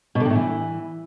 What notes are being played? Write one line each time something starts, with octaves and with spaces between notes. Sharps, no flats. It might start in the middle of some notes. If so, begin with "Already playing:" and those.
B2
D3
G2
A2
E3